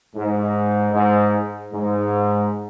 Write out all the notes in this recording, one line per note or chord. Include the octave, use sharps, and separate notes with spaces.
G#2
G#2
G#2